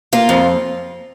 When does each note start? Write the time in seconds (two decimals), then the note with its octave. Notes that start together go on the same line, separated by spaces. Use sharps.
0.13 A#3 F4
0.29 F2